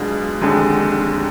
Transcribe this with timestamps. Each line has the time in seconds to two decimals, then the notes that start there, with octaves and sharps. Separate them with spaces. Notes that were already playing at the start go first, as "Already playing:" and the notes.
Already playing: B1 B2 G#3 D4 F4
0.41 F1 D#2 D3 G#3